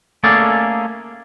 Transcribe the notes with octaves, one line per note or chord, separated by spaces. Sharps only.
A3 A#3 C#4 G#4 A4 D5